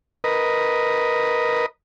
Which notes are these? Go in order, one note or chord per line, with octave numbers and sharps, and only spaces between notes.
A#4 B4 D#5